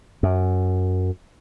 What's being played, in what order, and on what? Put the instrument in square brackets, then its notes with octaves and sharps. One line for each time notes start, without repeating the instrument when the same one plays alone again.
[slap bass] F#2